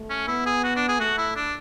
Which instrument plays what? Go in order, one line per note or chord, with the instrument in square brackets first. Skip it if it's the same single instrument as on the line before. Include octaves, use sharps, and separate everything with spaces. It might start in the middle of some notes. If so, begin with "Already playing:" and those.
Already playing: [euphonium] A3
[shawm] C#4
[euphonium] B3 [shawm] E4
[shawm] G#4
F#4
D4
G#4
[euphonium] A3 [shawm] F#4
[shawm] E4
D4